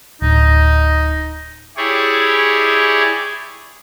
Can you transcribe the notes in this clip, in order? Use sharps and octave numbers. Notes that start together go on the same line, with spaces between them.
D1 D#4
E4 G4 G#4 C#5 D5